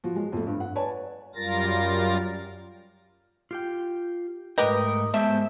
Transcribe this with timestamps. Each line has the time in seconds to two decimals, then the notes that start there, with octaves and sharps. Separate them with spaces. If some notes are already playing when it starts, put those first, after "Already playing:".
0.04 F3 F#4
0.15 F#3 G#3
0.32 F2 A3
0.47 G2
0.60 F#5
0.75 B4 C#5 D5 G#5 A5
1.35 F#2 G3 F4 A#4 A6 A#6
3.51 F4 G4 G5
4.58 G#2 A3 G4 A#4 B4 D#5 G5
5.14 G#3 B3 G4 C5 E5 A5